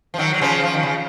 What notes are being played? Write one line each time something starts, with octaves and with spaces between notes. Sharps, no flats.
F3
D#3 F#3
F#3
C#3 F3
F3
D#3
C#3